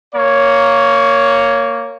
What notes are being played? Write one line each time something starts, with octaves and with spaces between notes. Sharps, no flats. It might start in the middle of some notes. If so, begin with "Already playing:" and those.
A#3 C#5